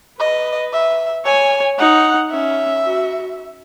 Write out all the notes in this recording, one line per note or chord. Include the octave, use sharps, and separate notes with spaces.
B4 D#5
E5
C#5 G#5
D#4 F#5
C#4 E5
F#4